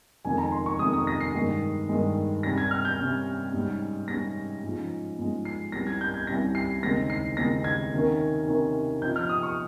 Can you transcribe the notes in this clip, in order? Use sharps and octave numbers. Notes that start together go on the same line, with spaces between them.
F2 C3 D#3 G#3 C#4 G#5
A#5
C6
C#6
F2 C3 D#3 G#3 C#4 D#6
D#6
A#6
C7
G2 D#3 G#3
G2 D#3 G#3
C3 G3 C#4 A#6
G#6
F6
G6
C3 G3 C#4
G#2 G3 C#4
G#2 G3 C#4 A#6
G#2 F3 G#3 C#4
G#2 F3 G#3 C#4
C7
C2 C3 G3 C#4 A#6
G#6
G6
G#6
C2 C3 G3 C#4 A#6
C7
D#2 C#3 G#3 C4 D#4 A#6
C7
D#2 C#3 G#3 C4 D#4 A#6
G#6
C3 D#3 A#3 C#4
C3 D#3 A#3 C#4
C3 F3 C4 D#4 G6
F6
D#6
C#6